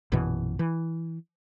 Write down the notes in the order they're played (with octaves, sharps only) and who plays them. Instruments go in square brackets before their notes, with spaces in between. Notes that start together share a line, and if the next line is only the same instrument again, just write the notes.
[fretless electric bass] A#1 F#2 B2 E3
E3